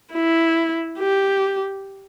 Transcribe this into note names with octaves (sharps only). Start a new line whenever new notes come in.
E4
G4